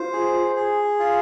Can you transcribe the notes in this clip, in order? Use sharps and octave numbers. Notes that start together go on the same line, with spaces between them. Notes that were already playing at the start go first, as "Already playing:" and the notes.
Already playing: F4 C5
G#4
G#4
F4